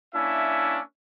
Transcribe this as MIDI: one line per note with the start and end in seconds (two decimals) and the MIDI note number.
0.14 0.79 58
0.14 0.79 61
0.14 0.79 62
0.14 0.79 64
0.14 0.79 76